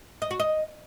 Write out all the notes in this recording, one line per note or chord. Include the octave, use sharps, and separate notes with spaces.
D#5
F#4
D#5